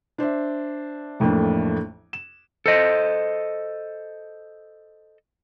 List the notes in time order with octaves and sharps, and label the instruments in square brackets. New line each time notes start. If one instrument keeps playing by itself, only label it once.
[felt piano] D4 C5 D5 E5
A1 F2 A2 A3 A#3 D4
E7
[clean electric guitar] A4 C5 D#5